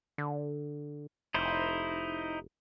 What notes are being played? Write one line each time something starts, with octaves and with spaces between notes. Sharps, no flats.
D3
F1 D#4 E4 C5